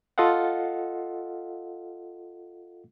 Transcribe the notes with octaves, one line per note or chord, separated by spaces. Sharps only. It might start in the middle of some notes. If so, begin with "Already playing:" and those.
F4 A4 D#5 F5 F#5